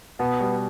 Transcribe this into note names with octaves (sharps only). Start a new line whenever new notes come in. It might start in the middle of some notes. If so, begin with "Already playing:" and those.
B2 B3
G3